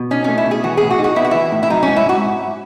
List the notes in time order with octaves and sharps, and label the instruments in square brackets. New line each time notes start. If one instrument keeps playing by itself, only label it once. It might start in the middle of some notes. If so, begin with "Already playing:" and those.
Already playing: [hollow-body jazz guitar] B2
[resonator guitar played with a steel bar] C#4 [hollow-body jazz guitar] D#4
[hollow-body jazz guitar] A3 [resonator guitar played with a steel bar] C#4
[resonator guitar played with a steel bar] E4
[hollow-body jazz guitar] B2
[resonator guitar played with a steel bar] G#4
[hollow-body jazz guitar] E3 [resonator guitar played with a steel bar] F#4
[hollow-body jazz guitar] A2 [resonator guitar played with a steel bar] G#4
[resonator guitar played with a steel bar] F#4
[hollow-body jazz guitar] D#4
[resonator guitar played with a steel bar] F#4
[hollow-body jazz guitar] B3 [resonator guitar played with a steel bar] E4
[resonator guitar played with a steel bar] F#4
[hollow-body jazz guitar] E3 [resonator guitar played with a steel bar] E4
[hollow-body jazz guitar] A2
[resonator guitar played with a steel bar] E4
[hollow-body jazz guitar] F#3 [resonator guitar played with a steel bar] D#4
[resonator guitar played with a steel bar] C#4
[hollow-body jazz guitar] G#2
[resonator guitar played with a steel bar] E4
[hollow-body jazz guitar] G#2 [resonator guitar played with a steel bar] F#4